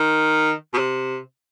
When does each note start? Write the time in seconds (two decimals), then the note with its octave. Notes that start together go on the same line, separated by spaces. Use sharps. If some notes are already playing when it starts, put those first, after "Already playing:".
Already playing: D#3
0.74 B2
0.78 C3